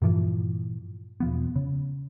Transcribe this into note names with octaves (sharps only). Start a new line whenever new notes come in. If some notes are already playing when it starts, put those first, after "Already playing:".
G2 A#2 E3 F3
E1 F3 B3
C#3